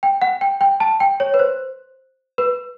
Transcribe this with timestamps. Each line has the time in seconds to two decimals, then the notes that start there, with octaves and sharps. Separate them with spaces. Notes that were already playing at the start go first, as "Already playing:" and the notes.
0.03 G5
0.22 F#5
0.41 G5
0.61 G5
0.80 A5
1.00 G5
1.20 C#5
1.34 B4
1.39 C5
2.38 B4